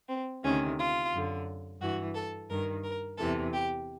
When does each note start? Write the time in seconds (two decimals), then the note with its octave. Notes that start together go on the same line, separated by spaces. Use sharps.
0.09 C4
0.43 D2 C3 D#3 C#4
0.78 F4
1.12 F#2 D3
1.80 G2 E3 F#4
2.14 A4
2.49 G2 D#3 A#4
2.84 A#4
3.17 E2 C3 E3 A4
3.53 G4